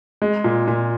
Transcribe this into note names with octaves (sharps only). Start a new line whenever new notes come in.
G#3
A#2
A#2